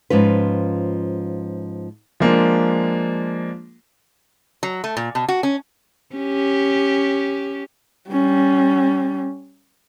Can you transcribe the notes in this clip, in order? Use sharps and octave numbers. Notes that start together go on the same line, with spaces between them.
G#2 F3 C#4 F4 B4
F3 G#3 A#3 D4
F#3
A3
A#2
B2
F#4
C#4
C#4 G4
G3 C#4